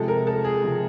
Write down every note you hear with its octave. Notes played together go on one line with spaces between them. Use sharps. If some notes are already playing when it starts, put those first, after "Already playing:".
Already playing: C3 F3 G#3 A4
A#4
A4
G#4
C3 F3 G#3